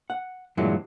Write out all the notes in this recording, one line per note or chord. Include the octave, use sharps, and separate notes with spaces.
F#5
G2 A#2 E3 F#3 G#3